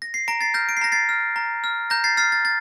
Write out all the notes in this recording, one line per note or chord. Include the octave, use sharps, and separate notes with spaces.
A#6
C7
A#5 A#6 D7
A6 C7
F6 G6 A#6
D7
C7
A#5 A#6
A6 C7
F6
A#5
F6
A#5 G6 A#6
A6 C7
F6 A6 C7
A6
A6